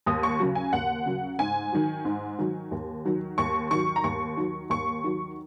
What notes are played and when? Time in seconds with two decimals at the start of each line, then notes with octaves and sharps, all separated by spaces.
0.06 D#2 D#6
0.23 C#6
0.39 C#3 F#3
0.55 G#5
0.73 D#2 F#5
1.05 C#3 F#3
1.39 G#2 G#5
1.72 D#3 F#3
2.05 G#2
2.38 D#3 F#3
2.71 D#2
3.05 D#3 F#3
3.38 D#2 C#6
3.71 D#3 F#3 C#6
3.96 A#5
4.04 D#2 C#6
4.37 D#3 F#3
4.70 D#2 C#6
5.04 D#3 F#3